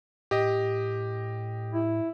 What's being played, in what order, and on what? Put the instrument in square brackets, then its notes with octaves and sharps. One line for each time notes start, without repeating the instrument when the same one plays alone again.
[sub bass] A2 [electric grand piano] G4 D#5
[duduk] E4